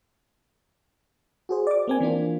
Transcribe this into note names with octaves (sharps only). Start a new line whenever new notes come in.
F#4 G#4 C5
D5 D6
A#3 C4 G#5
E3 A#3 D4 F4